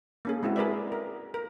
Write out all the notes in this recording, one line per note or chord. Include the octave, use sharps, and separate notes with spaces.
A#3 C#4 G#4
G#3 C4 E4 F#4
G#4 A#4 B4 D5 E5
A#4
A#4